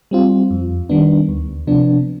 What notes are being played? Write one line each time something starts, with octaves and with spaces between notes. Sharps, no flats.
G3 C4 F4
F2
D#3 G3 B3 D4
D2
C3 F3 B3 D4